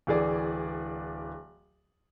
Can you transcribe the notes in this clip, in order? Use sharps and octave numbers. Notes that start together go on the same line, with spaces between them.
D1 E3 G#4 D5